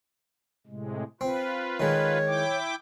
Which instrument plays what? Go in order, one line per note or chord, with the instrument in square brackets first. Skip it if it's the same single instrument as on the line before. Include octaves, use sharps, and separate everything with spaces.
[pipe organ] A2 C3 G#3
[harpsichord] C4 [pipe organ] F4 B4
[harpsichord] D#3 G#3 [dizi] C#5
[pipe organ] E4 G5 D6